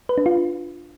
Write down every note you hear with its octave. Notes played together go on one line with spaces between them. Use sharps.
B4
D4
F4